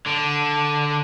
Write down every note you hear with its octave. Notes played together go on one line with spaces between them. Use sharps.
D3 D4